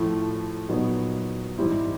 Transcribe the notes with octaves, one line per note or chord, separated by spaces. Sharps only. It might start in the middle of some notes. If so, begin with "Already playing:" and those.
Already playing: A2 F3 A3
A#2 F#3 B3 D#4
G#2 E3 G3 C4 E4